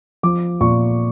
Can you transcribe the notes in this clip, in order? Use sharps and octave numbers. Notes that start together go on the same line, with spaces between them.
F3 D6
A#2 C#6